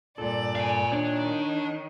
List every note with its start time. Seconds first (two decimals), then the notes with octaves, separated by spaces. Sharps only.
0.18 G2 A#2 A4 D5
0.55 F5 G#5
0.92 D#3 D4 C#5